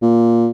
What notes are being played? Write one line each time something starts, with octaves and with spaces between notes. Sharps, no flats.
A#2